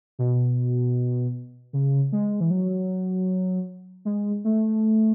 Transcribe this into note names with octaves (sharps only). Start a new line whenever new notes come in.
B2
C#3
G#3
E3
F#3
G#3
A3